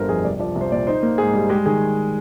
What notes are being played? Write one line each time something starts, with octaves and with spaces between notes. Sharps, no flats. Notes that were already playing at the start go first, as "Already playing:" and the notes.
Already playing: G1 A#2 D3 G3 A#4 C5
F2 G#4
C2 D5
F3 D5
C2
C5
A#2 D5
D#4 C5
A#3
G#2 G#4
G3
G#3 G4
D#3 G#4